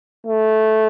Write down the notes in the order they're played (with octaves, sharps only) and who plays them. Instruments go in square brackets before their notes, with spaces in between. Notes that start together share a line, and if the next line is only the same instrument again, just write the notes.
[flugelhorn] A3